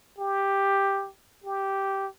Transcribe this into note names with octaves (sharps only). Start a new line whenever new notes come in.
G4
G4